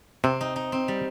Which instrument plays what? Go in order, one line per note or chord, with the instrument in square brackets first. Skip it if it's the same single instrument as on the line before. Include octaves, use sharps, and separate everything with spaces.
[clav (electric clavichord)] C3 [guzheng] C4
[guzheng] D#4
D#4
C4
G3